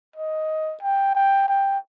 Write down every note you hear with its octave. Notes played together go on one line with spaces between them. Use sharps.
D#5
G5
G5
G5